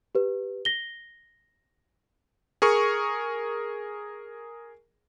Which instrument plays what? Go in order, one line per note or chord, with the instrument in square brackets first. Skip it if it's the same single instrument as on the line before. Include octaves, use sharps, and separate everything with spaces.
[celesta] G4 B4
A#6 G7
[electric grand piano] G#4 A#4 C#6